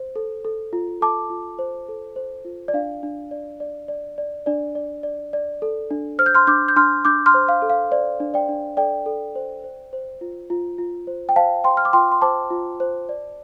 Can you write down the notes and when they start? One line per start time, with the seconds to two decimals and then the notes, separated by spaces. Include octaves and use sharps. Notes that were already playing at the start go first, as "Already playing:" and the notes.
Already playing: C5
0.16 A4
0.45 A4
0.73 F4
1.01 A4 A5 D6
1.30 F4
1.59 C5
1.89 A4
2.16 C5
2.45 F4
2.68 D5
2.74 D4 F5
3.03 D4
3.31 D5
3.60 D5
3.88 D5
4.18 D5
4.46 D4 D5
4.75 D5
5.03 D5
5.33 D5
5.62 A4
5.91 D4
6.19 C5 F6
6.26 G6
6.35 C6 F6
6.47 D4 D6 G6
6.68 G6
6.76 D4 C6 F6
7.05 D4 D6 G6
7.26 C6 F6
7.34 C5
7.49 F5
7.62 A4
7.70 F5
7.91 C5 D5
8.20 D4
8.34 D5 G5
8.49 D4
8.77 A4 D5 G5
9.06 A4
9.35 C5
9.64 C5
9.93 C5
10.21 F4
10.50 F4
10.78 F4
11.07 C5
11.29 G5
11.36 C5 F5 A5
11.64 C5 G5 C6
11.77 F6
11.85 D6
11.93 F4 G5 C6
12.12 C6
12.22 C5 A5 D6
12.50 F4
12.80 C5
13.09 D5